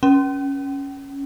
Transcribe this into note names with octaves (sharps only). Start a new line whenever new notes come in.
C#4